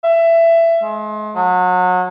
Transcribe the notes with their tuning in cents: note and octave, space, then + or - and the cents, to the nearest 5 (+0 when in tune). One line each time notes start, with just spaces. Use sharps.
E5 +20
G#3 +40
F#3 -30